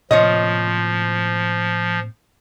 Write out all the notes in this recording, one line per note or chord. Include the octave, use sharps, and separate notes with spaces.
A2 C3 F3 A#3 F4 C#5 D#5